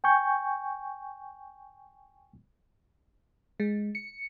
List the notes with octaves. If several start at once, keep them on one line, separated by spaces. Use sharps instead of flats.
G5 G#5 C#6 G6
G#3
C#7